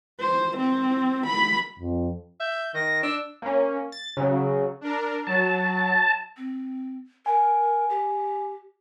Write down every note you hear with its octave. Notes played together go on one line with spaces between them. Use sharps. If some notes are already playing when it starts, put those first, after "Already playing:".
C5
C4
B5
F2
E5 G6
D#3 A#6
D4 E6
A#3 C#4
A6
C#3 F#3
D4 A#4
F#3 A5
C4
A#4 G#5
G4